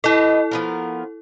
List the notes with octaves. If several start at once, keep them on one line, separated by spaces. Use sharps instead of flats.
E4 A4 B4 D#5
F3 B3 A#4